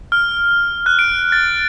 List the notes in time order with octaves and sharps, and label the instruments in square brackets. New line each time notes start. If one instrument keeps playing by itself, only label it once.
[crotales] F6
F#6
D7
A6